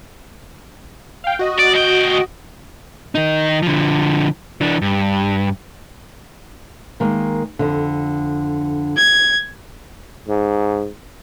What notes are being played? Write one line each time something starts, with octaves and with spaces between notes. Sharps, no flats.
F5 G5
F#4 D#5
D5
D2 G5
D#3 D#4
D3 F3
E3 D4
G2
D#3 G#3 A#3
F2 D3
G#6
G#2